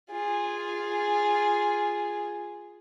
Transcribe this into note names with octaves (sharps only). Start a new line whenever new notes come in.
F4 G#4